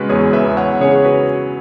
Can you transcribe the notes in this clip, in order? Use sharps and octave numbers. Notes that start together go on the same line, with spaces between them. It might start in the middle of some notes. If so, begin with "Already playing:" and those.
Already playing: C#3 G#3 F#4 B4
E2 G#4 C#5
B4 E5
E2
C#5 F#5
C#3 G#4 C#5
C#5
F#4 B4